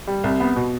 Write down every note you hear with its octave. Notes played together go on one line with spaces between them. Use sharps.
G3
C2
B3
B2